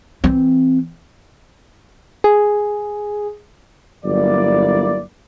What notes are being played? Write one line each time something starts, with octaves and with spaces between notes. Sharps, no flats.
E3 C4
G#4
G1 F#3 A#3 E4 D5